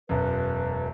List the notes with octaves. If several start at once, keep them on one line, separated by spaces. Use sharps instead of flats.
E1 F#2 B4